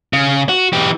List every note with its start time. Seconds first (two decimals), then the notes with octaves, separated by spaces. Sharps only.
0.13 C#3
0.49 F#4
0.73 E3 G4